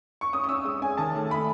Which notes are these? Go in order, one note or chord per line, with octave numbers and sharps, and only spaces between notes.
C#6
C#4 D#6
D#6
C#4 E6
G#3 D#6
C#4 G#5
D#3 A5
A3
A3 B5